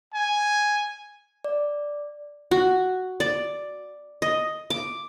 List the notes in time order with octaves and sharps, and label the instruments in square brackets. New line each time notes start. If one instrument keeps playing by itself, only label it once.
[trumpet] G#5
[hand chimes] D5
[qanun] F#4
D5
D#5
D6